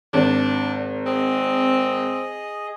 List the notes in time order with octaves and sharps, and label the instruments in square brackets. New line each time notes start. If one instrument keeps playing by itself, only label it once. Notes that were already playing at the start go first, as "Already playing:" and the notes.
[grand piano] G#1 [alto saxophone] D4
[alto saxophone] C4 [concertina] G#4 D#5